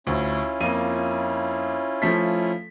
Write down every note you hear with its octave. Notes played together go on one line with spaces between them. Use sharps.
D2 C#4 E4 F4
F2 A#3 D#7
F3 A3 B6